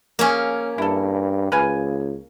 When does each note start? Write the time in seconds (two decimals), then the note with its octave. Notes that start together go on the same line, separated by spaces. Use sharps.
0.19 A#3 C#4 G#4 C#5 F5
0.78 G2 E4 A4
1.52 C#2 B4 F5 G#5